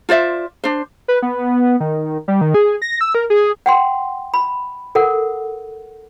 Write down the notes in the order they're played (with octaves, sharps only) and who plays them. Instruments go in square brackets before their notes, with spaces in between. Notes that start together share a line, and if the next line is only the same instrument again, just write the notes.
[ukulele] F4 C5 D5 E5
D4 C5
[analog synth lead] B4
B3
D#3
G3
D#3
G#4
A#6
E6
A#4
G#4
[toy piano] F#5 G5 C6
B5
A4 A#4 F#5